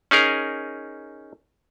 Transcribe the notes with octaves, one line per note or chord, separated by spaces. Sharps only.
C#4 D#4 G#4 A#4